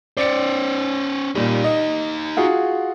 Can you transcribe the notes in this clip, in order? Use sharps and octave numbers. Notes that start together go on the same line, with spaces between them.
C#4 C5 D5 C#7
A#2 G3 D#4 G4
D#5
F4 F#4 G#4